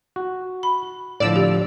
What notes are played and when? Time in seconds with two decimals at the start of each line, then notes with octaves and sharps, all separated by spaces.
0.16 F#4
0.63 B5
1.20 A2 D3 F3 D5 E6
1.36 G4